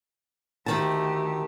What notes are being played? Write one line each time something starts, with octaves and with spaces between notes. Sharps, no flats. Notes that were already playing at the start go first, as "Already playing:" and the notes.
D2 D#3 A3 G4 A5